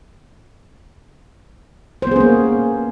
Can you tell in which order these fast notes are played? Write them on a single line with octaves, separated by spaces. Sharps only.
C5 B3 G#4 C#4 A#3